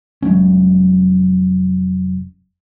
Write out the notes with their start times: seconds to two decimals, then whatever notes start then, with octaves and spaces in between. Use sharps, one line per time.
0.22 F1 F#3 G#3 C#4